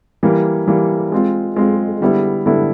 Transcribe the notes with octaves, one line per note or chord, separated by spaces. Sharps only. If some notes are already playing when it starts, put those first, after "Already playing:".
E3 G3 A#3
E3 G3 A#3
G#3 C4 F4
G#3 C4 F4
D3 G3 B3 E4
D3 G3 B3 E4